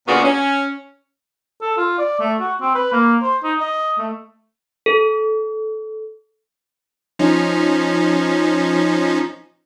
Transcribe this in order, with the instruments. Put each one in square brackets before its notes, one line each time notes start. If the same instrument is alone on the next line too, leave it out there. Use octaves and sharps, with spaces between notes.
[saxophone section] A#2 C#3 B3 F#4 D5 F5
C#4
[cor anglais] A4
F4
D5
A3
F#4
C4
B4
A#3
C5
D#4
D#5
A3
[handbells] A4
[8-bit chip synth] F3 C#4 D#4